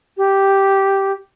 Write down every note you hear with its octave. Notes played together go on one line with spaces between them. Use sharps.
G4